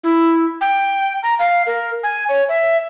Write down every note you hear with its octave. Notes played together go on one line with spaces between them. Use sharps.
E4
G5
A#5
F5
A#4
G#5
C#5
E5